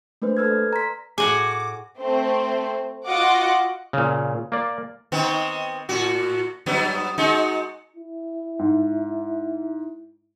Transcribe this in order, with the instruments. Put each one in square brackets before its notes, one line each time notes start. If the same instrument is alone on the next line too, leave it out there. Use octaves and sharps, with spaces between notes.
[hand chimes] A3 A#3 D4 B4 C5
A4 B4 E6 F6 G#6
D5
A#5 C6 B6
[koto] A2 F#4 G#5 [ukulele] G#4 [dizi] D6
[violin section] A3 C4 C5
F4 F#4 D#5 F#5 D6
[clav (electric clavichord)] A#2 C#3
A#3 D5
[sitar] D#3 B3 C4
A2 F#4
G2 F#3 B3
G#3 D#4 F#4
[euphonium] E4
[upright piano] G#2